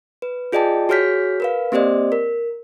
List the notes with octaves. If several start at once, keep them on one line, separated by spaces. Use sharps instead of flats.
B4
F4 G#4 D5 D#5 G5 A5
F#4 G#4 C#5 F6 G6 B6
A#4 B4 F5
A#3 C4 G4 C5 D5 D#5
A#4